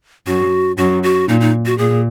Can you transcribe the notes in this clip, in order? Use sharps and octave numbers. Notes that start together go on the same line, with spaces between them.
F#2 F#4
F#2 F#4
F#4
A#2 D#4
D#4
F#4
A#2 G#4